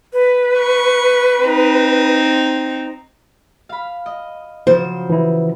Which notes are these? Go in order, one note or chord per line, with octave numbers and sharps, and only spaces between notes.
B4
C#6
C4 D#4
F5 B5
D#5
C#3 F3 F#3 C5
E3 E4